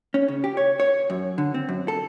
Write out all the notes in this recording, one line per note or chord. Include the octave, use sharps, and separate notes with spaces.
C#4
C#3
G4
C#5
C#5
F#2
D3
C4
F#2
A4